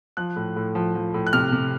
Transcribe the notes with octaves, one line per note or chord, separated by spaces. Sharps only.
F3 F#6
A2
A2
F3
F3
A2
F#6
C3 F6
C3